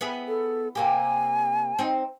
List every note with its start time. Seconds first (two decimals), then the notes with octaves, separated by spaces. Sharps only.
0.01 B3 E4 G#4
0.28 A4
0.75 C3 A#3 G4 G#5
1.79 C4 D#4